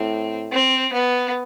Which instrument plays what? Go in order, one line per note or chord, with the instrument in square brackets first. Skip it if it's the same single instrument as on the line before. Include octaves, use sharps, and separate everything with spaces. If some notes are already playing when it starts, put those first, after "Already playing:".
Already playing: [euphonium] A2 [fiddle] C4
[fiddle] C4
B3